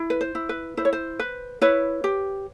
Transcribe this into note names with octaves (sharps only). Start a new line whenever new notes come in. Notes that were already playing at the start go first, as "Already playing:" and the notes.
Already playing: E4
B4
C5
E4
B4
E4 C5
C#5
C5
B4
E4 B4 C#5
G4